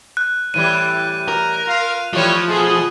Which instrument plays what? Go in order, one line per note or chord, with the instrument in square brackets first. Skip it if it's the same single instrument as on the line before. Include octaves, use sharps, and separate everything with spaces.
[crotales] F#6
[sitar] A2 E3 G3 [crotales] D#7
[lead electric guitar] A#4
[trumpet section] F4 F5
[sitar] E3 G3 A3 [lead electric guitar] F3 [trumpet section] C#5
[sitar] B2 A3 [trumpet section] G#4